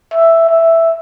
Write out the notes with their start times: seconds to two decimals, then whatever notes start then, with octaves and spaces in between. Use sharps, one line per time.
0.13 E5
0.49 E5